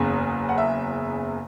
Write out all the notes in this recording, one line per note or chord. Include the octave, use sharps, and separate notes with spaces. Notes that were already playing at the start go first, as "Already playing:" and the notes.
Already playing: F#1 E2 C#3
F#5
E5